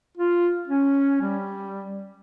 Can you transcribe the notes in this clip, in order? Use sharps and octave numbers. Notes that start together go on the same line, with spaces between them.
F4
C#4
G3